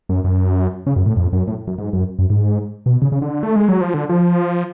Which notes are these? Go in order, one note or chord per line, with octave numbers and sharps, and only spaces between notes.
F#2
F#2
C#3
F#2
A2
F2
F#2
A2
F#2
G#2
F#2
F#2
G#2
B2
C#3
C#3
D3
A3
G#3
F#3
F3
D3
F3